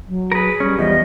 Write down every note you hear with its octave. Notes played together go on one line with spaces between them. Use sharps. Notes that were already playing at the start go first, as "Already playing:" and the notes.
F#3
G#4 A#4 B4
G3 C#4
E2 F3 D#5